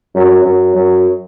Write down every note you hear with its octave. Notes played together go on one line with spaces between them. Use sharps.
F#2
F#2
F#2